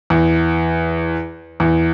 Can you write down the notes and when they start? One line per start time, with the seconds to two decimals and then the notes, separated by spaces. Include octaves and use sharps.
0.10 E2
1.60 E2